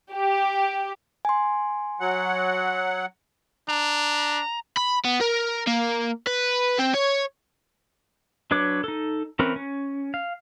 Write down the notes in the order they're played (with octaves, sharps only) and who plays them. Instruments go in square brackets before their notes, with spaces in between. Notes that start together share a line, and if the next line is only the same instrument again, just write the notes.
[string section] G4
[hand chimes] G#5 C6
[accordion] F#3 F#5
[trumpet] D4 [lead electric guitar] A#5
[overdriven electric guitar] B5
B3
A#4
A#3
B4
C4
C#5
[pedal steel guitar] F#3 D4 B4 C#5 D6
D#4 A4
E3 C4 C#4 A#4 B4
C#4
F5